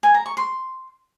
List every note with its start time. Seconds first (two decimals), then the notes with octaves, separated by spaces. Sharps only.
0.03 G#5
0.14 A#5
0.26 C#6
0.37 C6